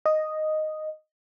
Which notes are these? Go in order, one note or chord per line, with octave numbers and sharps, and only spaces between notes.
D#5